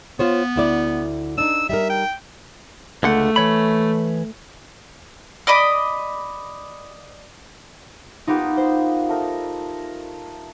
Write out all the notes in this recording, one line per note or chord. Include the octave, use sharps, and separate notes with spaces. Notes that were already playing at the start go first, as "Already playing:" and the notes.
B3 F4 C5 C#5
D2 E4 D5
D4 D#4 E6
G3 D#4 A#4 E5
G5
C#2 D3 A3 F#5
E3 C#5 B5
D5 D#5 B5 D6
A#3 B3 D#4 F4 G4
C5
A3 D#4 A#4